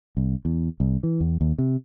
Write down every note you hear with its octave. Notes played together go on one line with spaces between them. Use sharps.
C2
E2
C2
E3
E2
D#2
C3